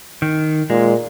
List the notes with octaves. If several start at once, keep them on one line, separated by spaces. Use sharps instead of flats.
D#3
A#2 G#3